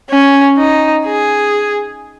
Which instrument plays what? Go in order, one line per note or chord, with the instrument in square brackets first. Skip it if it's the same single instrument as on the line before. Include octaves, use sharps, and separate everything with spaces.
[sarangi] C#4
D#4
G#4